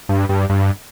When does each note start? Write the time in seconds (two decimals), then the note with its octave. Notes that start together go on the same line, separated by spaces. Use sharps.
0.09 G2
0.29 G2
0.49 G2